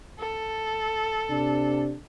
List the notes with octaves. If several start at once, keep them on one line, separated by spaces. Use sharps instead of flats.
A4
C3 D4